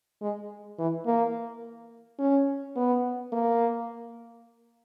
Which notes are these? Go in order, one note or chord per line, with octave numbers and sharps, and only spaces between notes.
G#3
E3
A#3
C#4
B3
A#3